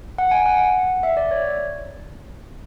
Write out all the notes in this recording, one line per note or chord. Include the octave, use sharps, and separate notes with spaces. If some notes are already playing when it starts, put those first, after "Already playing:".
F#5
G#5
F#5
E5
D5
C#5